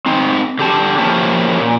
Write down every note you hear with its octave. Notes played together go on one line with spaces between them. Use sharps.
C4 D#4
D3 G4 A5
F3 A#3 C#4 E4 G4 A5
A#2